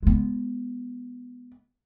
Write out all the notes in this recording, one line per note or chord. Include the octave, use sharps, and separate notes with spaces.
G#3 B3